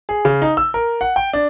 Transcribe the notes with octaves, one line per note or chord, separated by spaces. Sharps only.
G#4
C#3
D#4
E6
A#4
F#5
G5
D4